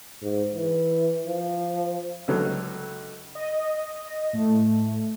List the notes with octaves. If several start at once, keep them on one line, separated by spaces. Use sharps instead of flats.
G#2
E3
F3
C#2 D3 F#3 A4
D#5
A2 A3